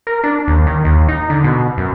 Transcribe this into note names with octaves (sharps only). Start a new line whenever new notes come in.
A#4
D4
D#2
D#3
D#2
D#4
D3
B2
F#2